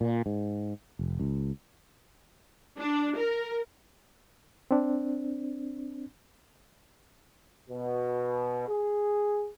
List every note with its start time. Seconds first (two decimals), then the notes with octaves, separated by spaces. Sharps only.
0.01 A#2
0.26 G#2
0.99 F1
1.19 C#2
2.77 D4
3.16 A#4
4.71 C4 D4
7.68 B2
8.68 G#4